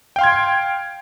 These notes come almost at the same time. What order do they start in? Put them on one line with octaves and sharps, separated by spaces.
G5 F5 C6 G#6